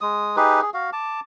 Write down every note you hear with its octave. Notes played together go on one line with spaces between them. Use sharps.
G#3 D#6
D#4 G4 G#4 B4
G#4
F#4 F5
A5 D6